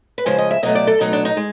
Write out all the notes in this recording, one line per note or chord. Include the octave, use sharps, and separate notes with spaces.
B4
C#3 F3 G#3 C5
D#5
E5
B2 F#3 A3 D#5
D5
A4
B2 F#3 A3 D#4
D4
D#4
G#3